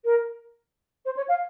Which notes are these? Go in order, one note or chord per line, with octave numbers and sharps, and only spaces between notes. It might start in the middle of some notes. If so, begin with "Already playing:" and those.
A#4
C5
C#5
F5